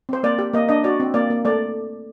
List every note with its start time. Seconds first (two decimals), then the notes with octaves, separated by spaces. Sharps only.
0.09 C4 C5
0.23 A#3 D5
0.39 G4
0.53 A#3 D#5
0.69 D4 D#5
0.84 F#4 D5
1.00 C4
1.14 A#3 D5
1.30 A#3
1.45 A3 D5